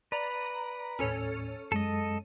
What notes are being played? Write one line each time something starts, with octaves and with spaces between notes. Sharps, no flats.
B4 D5 A#5
D#2 A2 C#4 A4 C#5
F#2 G#3 A4 D#5 D#7